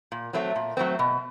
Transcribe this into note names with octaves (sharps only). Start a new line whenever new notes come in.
A#2
F#3 A3 C4
A#2
F#3 A3 C4
B2